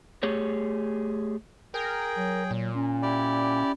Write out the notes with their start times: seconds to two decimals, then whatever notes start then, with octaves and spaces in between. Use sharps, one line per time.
0.23 A3 G4 G#4 C#5
1.74 G#4 A#4 G5
2.16 F#3
2.51 A#2
2.75 C#4
3.02 E4 G4 D5